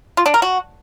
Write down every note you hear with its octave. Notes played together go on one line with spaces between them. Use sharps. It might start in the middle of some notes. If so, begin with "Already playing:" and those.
F4
D4
A#4
F#4